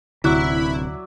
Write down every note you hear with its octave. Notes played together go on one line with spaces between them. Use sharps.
D1 D2 C3 F#3 E4 D5 E5 F#6